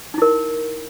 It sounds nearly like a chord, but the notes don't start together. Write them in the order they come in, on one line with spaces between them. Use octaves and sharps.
D#4 E4 A#4